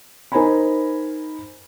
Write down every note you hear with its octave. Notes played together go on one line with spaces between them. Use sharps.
D#4 A#4 C5 G#5 A#5 B5